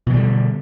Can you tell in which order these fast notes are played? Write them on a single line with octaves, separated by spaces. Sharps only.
B2 E3 G3 D3